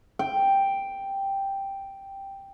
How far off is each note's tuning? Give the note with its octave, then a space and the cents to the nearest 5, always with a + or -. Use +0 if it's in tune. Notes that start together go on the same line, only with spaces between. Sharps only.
G5 +0